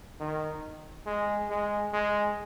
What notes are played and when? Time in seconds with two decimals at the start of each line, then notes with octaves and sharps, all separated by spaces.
0.20 D#3
1.06 G#3
1.50 G#3
1.93 G#3